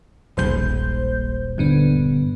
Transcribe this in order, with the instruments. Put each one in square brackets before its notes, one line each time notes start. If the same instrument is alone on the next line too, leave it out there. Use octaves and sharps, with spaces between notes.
[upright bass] D#1 G#3 [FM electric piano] A#1 C5 G6
[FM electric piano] G2 D3 B3